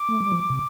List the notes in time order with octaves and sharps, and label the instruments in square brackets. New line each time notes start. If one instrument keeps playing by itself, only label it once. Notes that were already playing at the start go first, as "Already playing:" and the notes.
Already playing: [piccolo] D6
[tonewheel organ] A3
G3
F3
C3